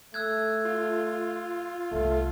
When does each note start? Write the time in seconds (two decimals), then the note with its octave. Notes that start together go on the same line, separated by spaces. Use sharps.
0.14 A3 E6 F#6 G#6
0.65 F4
1.92 C2 A3 D4